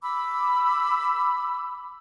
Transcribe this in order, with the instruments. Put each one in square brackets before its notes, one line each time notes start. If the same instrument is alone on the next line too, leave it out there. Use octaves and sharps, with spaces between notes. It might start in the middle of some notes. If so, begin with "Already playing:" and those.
[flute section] B5 D6 E6